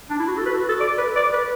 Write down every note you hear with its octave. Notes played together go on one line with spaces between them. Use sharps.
D4
E4
F#4
A4
B4
F#4
A4
D5
B4
D5
B4